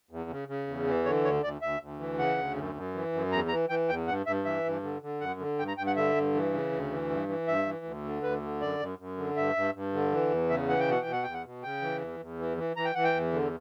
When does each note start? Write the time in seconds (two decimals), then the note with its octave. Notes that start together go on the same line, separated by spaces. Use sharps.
0.11 E2
0.30 C#3
0.48 C#3
0.67 E2
0.86 E3
1.05 D3 C#5
1.24 D2 C#5
1.43 D2 D5
1.62 D2 E5
1.81 D2
1.99 E3
2.19 C#3 F#5
2.38 D2
2.56 F#2
2.75 F#2
2.94 E3
3.13 F#2
3.32 E2 A#5
3.48 E3 A#5
3.69 E3 G5
3.89 E2 G5
4.08 G2 F#5
4.26 G2 E5
4.45 E3 E5
4.64 G2
4.83 D3
5.02 D3
5.21 F#2 F#5
5.40 D3
5.59 G2 G5
5.68 A#5
5.77 G2 G5
5.87 F#5
5.96 D3 E5
6.16 G2
6.34 E3
6.53 C#3
6.72 D2
6.91 E3
7.10 G2
7.28 E3
7.48 G2 E5
7.66 E3
7.85 D2
8.04 D3
8.23 D2 B4
8.42 D3
8.61 F#2 D5
8.80 F#2
8.99 F#2
9.17 D3
9.36 G2 E5
9.56 G2
9.74 G2
9.93 D3
10.12 E3
10.31 E2
10.50 C#3 E5
10.69 E3 F#5
10.79 G5
10.88 B2 F#5
11.01 G5
11.06 B2
11.12 F#5
11.23 E2 G5
11.33 F#5
11.44 B2
11.63 C#3 G5
11.82 E3
12.01 E2
12.20 E2
12.39 E3
12.57 E3
12.77 E3 A#5
12.85 G5
12.95 E3 F#5
13.04 G5
13.14 E2
13.33 D3